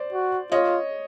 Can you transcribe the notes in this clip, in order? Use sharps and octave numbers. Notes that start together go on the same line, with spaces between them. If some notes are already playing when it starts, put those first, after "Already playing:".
Already playing: C5 D5
F#4
F4 C#5 D#5